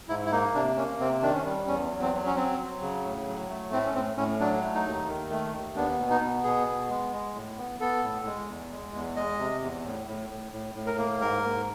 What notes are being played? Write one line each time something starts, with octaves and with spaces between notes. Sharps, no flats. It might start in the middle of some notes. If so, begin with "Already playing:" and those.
G#2 E4
E4
A#3 D#4
C3 D4
A#3 C#4
C3 C4
D#3 D4
C#4
G3
E2 C#4
F#3
C4
F#3
C#4
F#3 C4
F#3
C#3
A2
F#3
A3
A2 C4
C#4
A2 C4
A2 C#4
F#3 D4
A3
D#4
D#2
D#3
A3
D#2
B3 D4
B2
D#4
B3
B2 G#4
B3
G#3
G#3
A2
B3
B3 A4
A2
G#3
E2
G#3
E2
G#3 D#5
C3
E2
A2
A2
A2
A2
A2
A#4
A#3
G#2 A#4
G#2